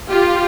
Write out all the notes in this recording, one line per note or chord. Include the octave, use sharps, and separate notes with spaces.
F4 G4